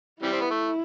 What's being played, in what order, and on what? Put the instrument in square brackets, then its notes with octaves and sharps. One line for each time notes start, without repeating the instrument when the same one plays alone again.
[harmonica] C3 E3 G3 [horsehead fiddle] E4
[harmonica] C4
B3
A3